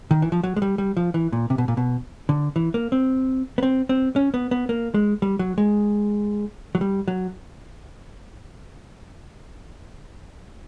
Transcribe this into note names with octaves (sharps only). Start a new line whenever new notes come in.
D#3
E3
F3
F#3
G#3
G3
G3
F3
E3
A#2
C3
B2
A#2
B2
D3
E3
A#3
C4
B3
C4
C4
C#4
B3
B3
A#3
G#3
G3
F#3
G#3
F#3
G3
F#3